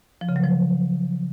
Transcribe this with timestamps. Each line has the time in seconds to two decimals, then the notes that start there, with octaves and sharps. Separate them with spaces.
0.21 F3
0.29 C#3
0.36 F#3
0.43 F3